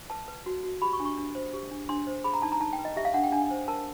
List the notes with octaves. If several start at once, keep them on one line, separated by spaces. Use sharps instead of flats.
B4 A5
B4
F#4
F#4
G4 B5
C#6
D4
C#6
D4
C5
G4
D4
D4 C6
C5
G#4 B5
A#5
D#4 A5
A#5
D#4 A5
G5
B4
D#5
G4 E5
F5
D4 F#5
G5
D4 G#5
C5
A#4 A5